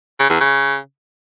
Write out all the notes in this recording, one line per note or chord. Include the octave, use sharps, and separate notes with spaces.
C#3
E2
C#3